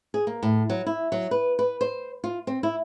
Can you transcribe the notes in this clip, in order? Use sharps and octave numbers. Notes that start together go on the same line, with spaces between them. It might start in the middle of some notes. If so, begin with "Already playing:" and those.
G#4
A#3
A2
F#3
E4
F#3
B4
B4
C5
F4
C4
E4